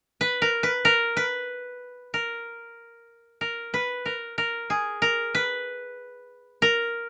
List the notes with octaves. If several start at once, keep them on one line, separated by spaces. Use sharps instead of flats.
B4
A#4
B4
A#4
B4
A#4
A#4
B4
A#4
A#4
G#4
A#4
B4
A#4